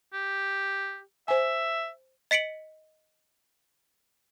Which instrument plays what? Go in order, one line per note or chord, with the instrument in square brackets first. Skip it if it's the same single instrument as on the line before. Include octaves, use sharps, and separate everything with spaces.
[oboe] G4
[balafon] C5 G#5 [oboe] E5
[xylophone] D#5 B6 C#7 D7 F#7